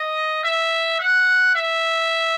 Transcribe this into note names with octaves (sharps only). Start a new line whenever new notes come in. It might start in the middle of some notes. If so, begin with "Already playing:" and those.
Already playing: D#5
E5
F#5
E5